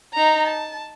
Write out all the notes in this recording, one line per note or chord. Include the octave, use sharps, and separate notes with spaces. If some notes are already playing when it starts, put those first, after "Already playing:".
D#4 A#5
A5